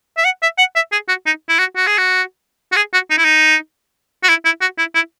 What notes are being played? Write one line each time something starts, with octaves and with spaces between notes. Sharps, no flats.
E5
F#5
E5
F#5
E5
G#4
F#4
D#4
E4
F#4
F#4
G#4
F#4
F#4
G#4
F#4
D#4
E4
D#4
F#4
E4
E4
F#4
E4
E4